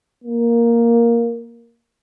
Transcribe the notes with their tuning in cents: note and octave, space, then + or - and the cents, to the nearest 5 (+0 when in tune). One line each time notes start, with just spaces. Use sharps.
A#3 +5